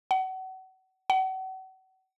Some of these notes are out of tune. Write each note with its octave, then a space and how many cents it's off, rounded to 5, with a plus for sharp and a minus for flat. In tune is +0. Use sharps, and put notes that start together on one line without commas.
F#5 +30
F#5 +35